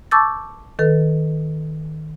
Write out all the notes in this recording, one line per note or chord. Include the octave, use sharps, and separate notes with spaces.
A5 C#6 D6 E6 G6 A6
D#3 A4 B4